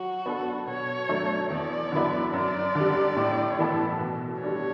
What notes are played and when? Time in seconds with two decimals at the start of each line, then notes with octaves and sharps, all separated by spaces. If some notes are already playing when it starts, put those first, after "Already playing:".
Already playing: F#3 F#4
0.26 B3 D4 A4
0.67 B2 C#5
1.08 F#3 A3 D4 A4
1.50 E2 D5
1.92 D3 F#3 B3 E4
2.33 F#2 D5
2.75 D3 G3
3.16 A2
3.58 E3 B3 E4 A4
4.00 B2
4.41 G3 D4 A4 C#5